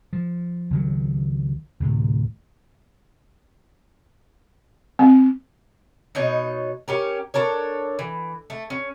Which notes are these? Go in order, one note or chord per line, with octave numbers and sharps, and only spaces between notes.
F3
C#2 D#3 F#3
D2 A2 C3
C4
B2 D#4 C#5
C#4 G4 A#4
D4 A4 A#4 C#5
E3
A3
C#4